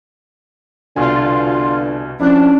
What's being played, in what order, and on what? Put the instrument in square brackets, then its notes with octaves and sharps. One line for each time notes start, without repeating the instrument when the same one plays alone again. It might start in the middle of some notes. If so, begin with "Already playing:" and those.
[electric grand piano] C2 B2 G#5 [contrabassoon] D3 [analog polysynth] F4
[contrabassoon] F2 [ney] C#4 [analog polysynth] D4 [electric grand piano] E4 F#6